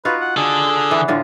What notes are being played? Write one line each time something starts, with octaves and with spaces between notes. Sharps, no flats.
D#4 F4 F#4 B4
F#5
D3 G#4 A4
E3 B3
A2 D3 F4